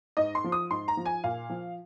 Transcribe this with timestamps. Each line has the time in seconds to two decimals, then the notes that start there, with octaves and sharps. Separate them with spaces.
0.17 G#2 D#5
0.35 C6
0.44 F3
0.52 D#6
0.71 G#2 C6
0.88 A#5
0.97 F3
1.06 G#5
1.24 A#2 F5
1.50 F3